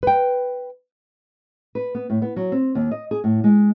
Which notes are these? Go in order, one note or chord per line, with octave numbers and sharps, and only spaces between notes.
B4 G5
B4
B3
A2
B3
F#3
C4
D#2
D#5
G#4
A2
G#3